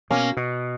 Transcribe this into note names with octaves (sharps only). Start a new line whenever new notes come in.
B2 A#3 C#4
B2